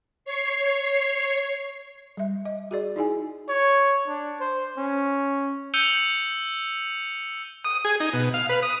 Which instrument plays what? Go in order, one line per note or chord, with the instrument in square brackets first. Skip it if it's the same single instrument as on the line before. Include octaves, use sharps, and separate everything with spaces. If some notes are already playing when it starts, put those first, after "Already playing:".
[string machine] C#5 C7
[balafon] G3 E5
D#5
F#4 G#4 D5
D#4 E4 G#4 G#5
[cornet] C#5
D4
C5
C#4
[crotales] E6 G6 C#7 D#7 F7 G7
[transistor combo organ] D#6
G#4
D#4
B2
F5
B4
D#6